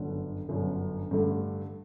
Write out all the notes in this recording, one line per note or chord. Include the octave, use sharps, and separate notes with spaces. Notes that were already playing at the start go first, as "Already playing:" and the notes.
Already playing: G1 F#2 D3
G1 F#2 D3
A1 G2 D3 A3